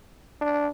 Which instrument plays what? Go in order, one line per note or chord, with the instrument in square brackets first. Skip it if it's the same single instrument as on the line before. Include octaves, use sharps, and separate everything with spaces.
[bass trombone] D4